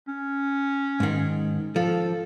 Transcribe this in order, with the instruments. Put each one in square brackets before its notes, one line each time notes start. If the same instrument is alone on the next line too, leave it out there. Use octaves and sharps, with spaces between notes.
[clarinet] C#4
[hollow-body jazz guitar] G#2 D#3
[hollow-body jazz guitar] F3 [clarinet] A4